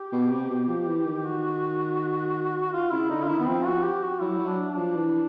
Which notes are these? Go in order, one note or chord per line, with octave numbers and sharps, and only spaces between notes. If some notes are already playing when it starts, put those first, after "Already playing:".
Already playing: G4
B2
C3
B2
F3
E3
D#3
F#4
F4
C#3 E4
D3 D#4
F4
D#3 E4
B3
F3 C4
F3 F#4
G4
F#4
F#3 E4
F#3
D4
D4
F3
E3